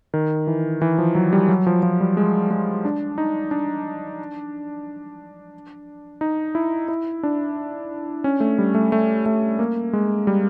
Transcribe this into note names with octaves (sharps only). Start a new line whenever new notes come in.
D#3
E3
E3
F3
F#3
G3
F#3
F3
F3
G3
G#3
G#3
D4
D#4
D4
D#4
E4
E4
D4
C#4
A3
G3
A3
A3
A3
A#3
G#3
G3